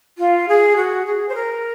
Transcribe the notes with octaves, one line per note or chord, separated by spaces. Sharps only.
F4
G#4
F#4
G#4
C5
A#4